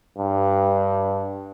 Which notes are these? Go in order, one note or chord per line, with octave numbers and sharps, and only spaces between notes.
G2